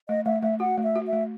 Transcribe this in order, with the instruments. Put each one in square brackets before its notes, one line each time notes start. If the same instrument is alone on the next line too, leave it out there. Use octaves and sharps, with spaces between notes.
[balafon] A3 [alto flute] D#5
[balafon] A3 [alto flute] E5
[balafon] A3 [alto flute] E5
[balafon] F#4 [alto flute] F#5
[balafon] A3
[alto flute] E5
[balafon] F#4
[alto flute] E5
[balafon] A3